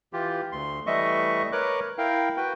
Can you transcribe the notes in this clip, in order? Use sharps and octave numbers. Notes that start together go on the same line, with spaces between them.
E3 F4 G4
D2 C6
E3 G3 A3 D#5 E5 C#6
A#4 B4 C#5 D6 F#6
E4 A#4 F5 G5
F#4 B4 G5